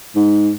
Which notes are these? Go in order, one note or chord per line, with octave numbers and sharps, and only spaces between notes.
G#2